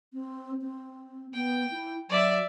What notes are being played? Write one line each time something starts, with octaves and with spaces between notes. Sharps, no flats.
C4
C4
B3 G5
E4
F#3 D5 E5